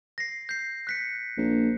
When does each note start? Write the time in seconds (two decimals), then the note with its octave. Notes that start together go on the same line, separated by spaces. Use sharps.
0.18 A#6 C7
0.49 G6 C7
0.87 F#6 B6 C#7
1.37 A#1